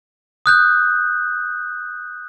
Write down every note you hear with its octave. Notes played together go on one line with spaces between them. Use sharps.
D#6 F#6 G6